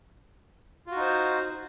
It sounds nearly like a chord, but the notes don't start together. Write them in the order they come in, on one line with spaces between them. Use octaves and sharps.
F4 F#4 D#4 C5